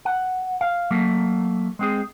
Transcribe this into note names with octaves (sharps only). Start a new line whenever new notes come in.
F#5
F5
F#3 A3 A#3
G#3 C4 G#4